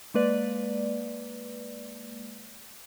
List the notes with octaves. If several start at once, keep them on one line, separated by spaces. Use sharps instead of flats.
G#3 A#3 B4 D5